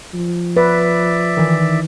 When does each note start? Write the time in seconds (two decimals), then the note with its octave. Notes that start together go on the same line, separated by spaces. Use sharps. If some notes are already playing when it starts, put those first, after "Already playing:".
0.14 F3
0.57 B4 D5 E5
1.37 D#3 E3